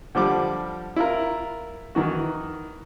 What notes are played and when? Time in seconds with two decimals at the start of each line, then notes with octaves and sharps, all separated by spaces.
0.15 D3 F3 G3 D6
0.96 E4 F4 A#4
1.95 D#3 E3 F#4